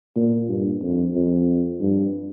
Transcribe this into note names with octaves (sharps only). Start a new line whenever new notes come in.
A#2
G2
F2
F2
G2